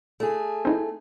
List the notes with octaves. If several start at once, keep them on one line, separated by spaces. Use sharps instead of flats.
A3 G#4
C4 D#4 E4